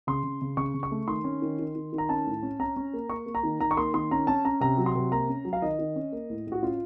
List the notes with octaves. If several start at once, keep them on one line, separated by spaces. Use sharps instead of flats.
C#3 C6
C#3
C#3
C#3 C#6
C#3
C#6
A3
D#3 C6
C#4
D#3
D#3
D#3
D#3
A#5
C#4 A5
A2
C#4
C#4 A#5
C#4
A#3
A#3 C#6
A#3
A#5
D#3
D#3 A#5
C#6
A#3 C6
D#3 C6
C#4 A#5
C#4 A5
C#4 A#5
C3 A#5
F#3
C6
C3
A#3 A#5
C#4
F#3
F5
D#3 D#5
D#3
C#4
A#3
A2
A2
F#4
C#4 F4